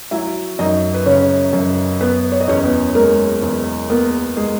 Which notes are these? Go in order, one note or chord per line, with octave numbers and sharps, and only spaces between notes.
F#3 E4 E5
F#2 D#4 D#5
B4
C#3 C#4 C#5
F#2
B3 B4
C#5
D#5
E2 C#4 C#5
B3 B4
G#3 A#3 A#4
E2
A#3 B3 A#4
G#3 G#4